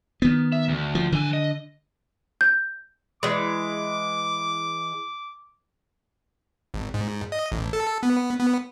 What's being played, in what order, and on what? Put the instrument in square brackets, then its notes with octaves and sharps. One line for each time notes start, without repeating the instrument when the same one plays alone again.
[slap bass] D#3 B3
[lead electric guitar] E5
D2
[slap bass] F3
[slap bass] D3 [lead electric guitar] E3 G#5
[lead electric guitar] D#5
[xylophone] G6
[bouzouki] E3 G#3 [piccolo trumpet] D6
[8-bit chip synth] G#1
G#2
D#5
A1
A4
B3
B3